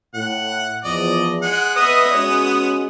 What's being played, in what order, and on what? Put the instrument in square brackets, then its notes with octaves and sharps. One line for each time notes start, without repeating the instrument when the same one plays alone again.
[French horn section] A2 [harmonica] F#5
[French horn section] E2 F3 [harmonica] D5 D#5
[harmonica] G#3 F#5
[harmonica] B3 D#6 [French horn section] B4 [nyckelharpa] D#5 E5
[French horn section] G#3 C#4 F#4 [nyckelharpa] C#5